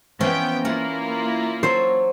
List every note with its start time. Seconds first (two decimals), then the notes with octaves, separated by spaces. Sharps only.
0.21 E3 F3 B3 C#4 G5
0.65 A#3 E4 F4 A#4 F#5
1.63 F#3 A4 C5 C#5